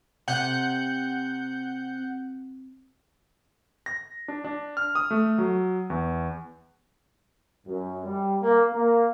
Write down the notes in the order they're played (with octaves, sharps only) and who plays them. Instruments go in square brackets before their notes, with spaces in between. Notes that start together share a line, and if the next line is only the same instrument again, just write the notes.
[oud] C3 [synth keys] F#5 G6
[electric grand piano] A#6
D4
D4
F6
D#6
A3
F#3
E2
[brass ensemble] F#2
G3
A#3
A#3